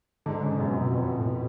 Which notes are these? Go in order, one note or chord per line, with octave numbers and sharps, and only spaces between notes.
G#2 D3
C#3
F#2 B2
F2
F#2
F2
A2
B2